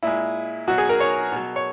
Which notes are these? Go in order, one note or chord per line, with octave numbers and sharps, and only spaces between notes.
A#2 G#3 E4
B2 F#3 F#4
G#4
A#4
C#5
B2 F#3
C#5